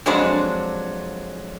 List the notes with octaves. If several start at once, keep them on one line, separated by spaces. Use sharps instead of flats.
F2 F#3 G#3 D4 C5